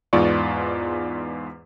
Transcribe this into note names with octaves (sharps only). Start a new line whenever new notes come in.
E2 G#2 B3 F4 D5 C#6